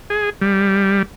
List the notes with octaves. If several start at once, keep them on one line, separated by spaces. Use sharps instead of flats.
G#4
G3